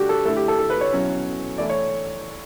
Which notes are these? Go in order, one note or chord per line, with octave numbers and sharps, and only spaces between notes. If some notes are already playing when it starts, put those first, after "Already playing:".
Already playing: D3 A3 D4 F#4 G4
A4
D3 A3 E4 A4
G4
A4
A4
B4
C#5
B2 F#3 C#4 E4
E3 A3 E4 D5
C#5